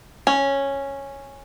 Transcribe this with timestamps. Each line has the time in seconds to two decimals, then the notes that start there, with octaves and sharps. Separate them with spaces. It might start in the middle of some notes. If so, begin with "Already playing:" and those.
0.27 C#4